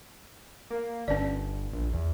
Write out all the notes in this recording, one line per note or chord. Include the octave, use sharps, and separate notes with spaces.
A#3
G1 C#4 B4 D5
A#1
E2